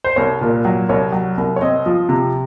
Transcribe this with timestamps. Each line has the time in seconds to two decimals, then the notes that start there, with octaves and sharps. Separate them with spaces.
0.04 C5
0.16 C2 C#5
0.41 A#2
0.65 F#3
0.89 C2 C#5
1.12 F#3
1.37 C2
1.56 C#5
1.61 C4 D#5
1.86 F3
2.09 C3